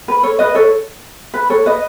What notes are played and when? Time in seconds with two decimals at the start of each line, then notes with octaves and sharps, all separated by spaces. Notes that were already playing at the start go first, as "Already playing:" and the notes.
0.08 B4
0.23 A4 C#5
0.39 B4 D#5
0.55 A4 C#5
1.34 B4
1.50 A4 C#5
1.66 B4 D#5